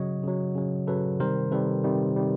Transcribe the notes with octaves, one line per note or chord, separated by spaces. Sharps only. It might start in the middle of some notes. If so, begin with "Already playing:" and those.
Already playing: C#3 F#3 C#5 D#5
C#3 F#3
C#3 F#3
C#3 F#3 A4 B4
C3 D#3 G3 A#4 C5
C3 D#3 G3 A4 B4
C3 D#3 G3
C3 D#3 G3